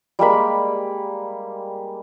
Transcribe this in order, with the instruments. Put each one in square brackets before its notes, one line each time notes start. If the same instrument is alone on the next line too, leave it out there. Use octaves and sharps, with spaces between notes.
[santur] G3 G#3 A#3 B5